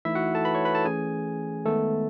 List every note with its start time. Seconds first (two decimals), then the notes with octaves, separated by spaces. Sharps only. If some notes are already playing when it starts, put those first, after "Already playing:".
0.05 E3 A3 D#4 E4 E5
0.15 F#4 F#5
0.35 A4 A5
0.45 B4 B5
0.55 C#5 C#6
0.65 B4 B5
0.75 A4 A5
0.85 E3 A3 C#4 G#4 G#5
1.65 D#3 G#3 A3 B3 A4